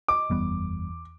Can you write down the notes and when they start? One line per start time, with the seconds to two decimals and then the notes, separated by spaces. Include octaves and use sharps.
0.08 D#5 D6
0.30 F#1 E2 G3 B3